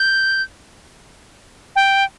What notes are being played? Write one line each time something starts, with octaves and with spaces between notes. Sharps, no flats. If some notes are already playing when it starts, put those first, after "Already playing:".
Already playing: G6
G5